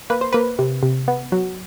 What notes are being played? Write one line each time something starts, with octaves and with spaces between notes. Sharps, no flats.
A#3 B4
C5
A#3 B4
C3
C3
B3
F#3